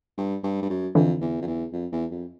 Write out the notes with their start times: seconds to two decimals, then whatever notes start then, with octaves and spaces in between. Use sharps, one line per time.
0.18 G2
0.43 G2
0.62 G2
0.70 F#2
0.95 F2 D3 E3
1.21 E2
1.42 F2
1.47 E2
1.73 F2
1.92 E2
2.11 F2